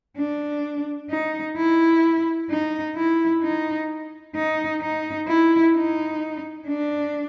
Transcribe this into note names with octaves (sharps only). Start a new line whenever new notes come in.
D4
D#4
E4
D#4
E4
D#4
D#4
D#4
E4
D#4
D4